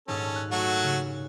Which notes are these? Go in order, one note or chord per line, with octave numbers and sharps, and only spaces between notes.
D#1 G#2 C#4 G#4 A4
F#6
F#3 A3 F#4
C#3